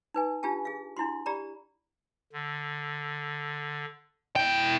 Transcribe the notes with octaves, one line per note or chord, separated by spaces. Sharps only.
D#4 B4 G#5
D4 F4 G4 G#5 A5
G#4 F5
D4 E4 F#4 C6
G4 D5 A#5 B5
D3
E4 G5